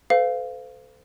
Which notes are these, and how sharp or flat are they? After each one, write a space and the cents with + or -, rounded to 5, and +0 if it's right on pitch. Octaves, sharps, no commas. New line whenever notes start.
A4 +0 C5 -40 F5 +0